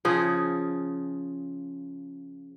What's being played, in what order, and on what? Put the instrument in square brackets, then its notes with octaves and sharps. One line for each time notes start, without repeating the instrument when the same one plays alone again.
[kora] C#3 F3 G#4